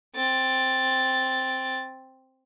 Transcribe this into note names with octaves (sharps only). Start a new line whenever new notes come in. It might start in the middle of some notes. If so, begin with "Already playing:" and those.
C4 A6